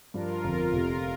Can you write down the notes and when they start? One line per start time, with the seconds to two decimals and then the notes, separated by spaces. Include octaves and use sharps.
0.14 G2 F3 D4 F4 A#4
0.44 G1 F2 D3 F3
0.73 F1 F2 C3